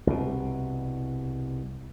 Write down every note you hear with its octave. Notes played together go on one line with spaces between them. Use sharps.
C2 B2